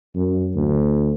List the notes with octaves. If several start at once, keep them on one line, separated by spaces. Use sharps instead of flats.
F#2
D2